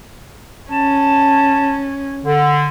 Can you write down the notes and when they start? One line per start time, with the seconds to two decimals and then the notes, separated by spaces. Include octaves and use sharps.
0.70 C#4 A5
2.23 D3